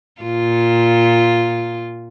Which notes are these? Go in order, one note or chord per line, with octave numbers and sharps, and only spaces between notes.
A#2 F4